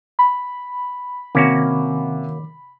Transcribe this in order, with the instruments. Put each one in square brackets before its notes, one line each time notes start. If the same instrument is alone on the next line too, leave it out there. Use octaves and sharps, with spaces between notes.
[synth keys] B5
[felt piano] C3 [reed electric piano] D#3 D6 [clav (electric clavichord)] A#3 C#4 F#4